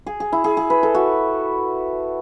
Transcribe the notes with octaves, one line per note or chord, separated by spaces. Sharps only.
G#4
G#4
E4
G#4
G#4
B4
A4
F#4